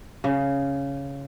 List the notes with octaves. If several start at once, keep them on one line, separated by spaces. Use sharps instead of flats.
C#3